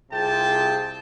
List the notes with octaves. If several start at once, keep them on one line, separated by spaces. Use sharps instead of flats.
C2 C3 F4 G#4 G5 A5